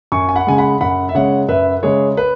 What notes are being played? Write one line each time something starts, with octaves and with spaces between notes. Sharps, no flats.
F#2 G#5 C#6
G#5
F#5 B5
C#3 G#3 G#5
F#5 B5
F#2 F#5 B5
E5
C#3 G#3 C#5 F#5
F#2 B4 E5
C#3 G#3 G#4 C#5
B4